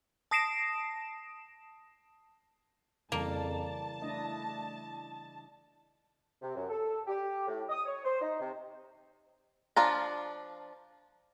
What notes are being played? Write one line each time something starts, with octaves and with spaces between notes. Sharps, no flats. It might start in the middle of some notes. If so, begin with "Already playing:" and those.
A5 D#6 A#6 C7 D7 E7
F2 C#3 E3 G3 A#3 A5
A3 D4 E4 D#5
C3
F#2
A4
G4
A2
D#6
C#5
C5
D#4
C3
F3 D4 F4 A#5